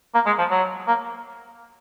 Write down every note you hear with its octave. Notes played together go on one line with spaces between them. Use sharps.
A#3
G#3
F3
F#3
A#3